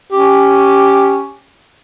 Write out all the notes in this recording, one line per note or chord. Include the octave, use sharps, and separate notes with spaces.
C#4 G4